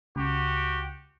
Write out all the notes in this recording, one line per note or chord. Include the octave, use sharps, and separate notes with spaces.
C#2 F#4 G4